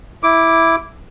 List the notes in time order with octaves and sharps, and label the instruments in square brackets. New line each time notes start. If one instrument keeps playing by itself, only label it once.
[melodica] E4 D6